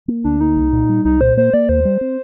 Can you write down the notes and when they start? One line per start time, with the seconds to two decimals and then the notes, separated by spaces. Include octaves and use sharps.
0.08 A#3
0.24 D2 D4
0.40 A#3 D#4
0.56 C2
0.73 A#2
0.89 G3
1.05 C2 D#4
1.21 A#2 C5
1.37 A#3 C5
1.53 A#3 D5
1.69 D#2 C5
1.85 G3
2.01 C4